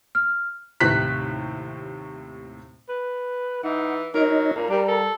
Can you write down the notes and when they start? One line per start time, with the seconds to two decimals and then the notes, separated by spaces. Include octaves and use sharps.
0.15 F6
0.80 D#2 A2 C3 F#6 B6
2.89 B4
3.63 E3 D#4 F#5
4.14 F#3 D#4 A#4 C#5 D#5
4.56 A#2 A#4 A#5
4.70 G3 D4
4.88 A4